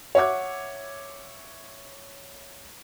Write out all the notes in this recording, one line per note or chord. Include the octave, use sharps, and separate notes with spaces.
C#5 E5 F#5 D6 G#6